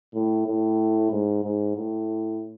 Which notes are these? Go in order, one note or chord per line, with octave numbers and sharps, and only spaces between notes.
A2
A2
G#2
G#2
A2